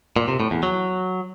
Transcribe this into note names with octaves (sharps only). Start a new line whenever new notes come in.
A#2
C3
A2
E2
F#3